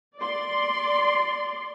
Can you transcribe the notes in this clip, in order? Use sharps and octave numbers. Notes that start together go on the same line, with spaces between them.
D5 C6